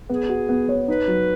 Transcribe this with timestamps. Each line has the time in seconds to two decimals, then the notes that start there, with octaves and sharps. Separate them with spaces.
0.09 B3 G#4
0.29 F#4
0.49 B3
0.69 C#5
0.88 D#4 B4
1.08 F#3